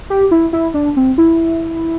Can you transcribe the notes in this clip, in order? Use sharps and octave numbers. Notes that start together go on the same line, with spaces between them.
G4
E4
E4
D4
C4
E4